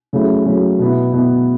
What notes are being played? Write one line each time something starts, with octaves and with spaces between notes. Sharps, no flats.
C#3 F#3 A3 C#4 E4
C#3 F#3 A3 C#4 E4
B2 B3 E4
B2 B3 E4